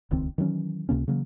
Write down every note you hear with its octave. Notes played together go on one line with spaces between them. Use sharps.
D#1 C#2 D#3 C4
D#3 E3 F#3 C#4
C#2 C3 A#3 C#4
C#3 E3 F#3 A#3